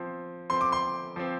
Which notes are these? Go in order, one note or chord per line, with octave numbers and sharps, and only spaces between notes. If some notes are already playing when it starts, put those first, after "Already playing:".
Already playing: F3 C4
F3 C4 C6
D6
C6
F3 C4